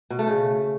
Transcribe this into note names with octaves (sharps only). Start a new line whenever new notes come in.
B2
A3
C#3